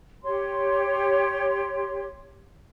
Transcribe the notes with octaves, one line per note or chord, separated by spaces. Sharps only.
G4 C#5 C6